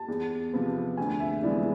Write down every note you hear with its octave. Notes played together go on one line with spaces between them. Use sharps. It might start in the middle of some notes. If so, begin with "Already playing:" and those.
Already playing: A5
E2
C3 F3 B3
D2 G#5
E5
C3 E3 G#3 B3 D5